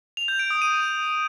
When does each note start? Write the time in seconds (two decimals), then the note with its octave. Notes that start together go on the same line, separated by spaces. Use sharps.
0.17 F7
0.28 G6
0.39 D7
0.51 D#6
0.62 D#7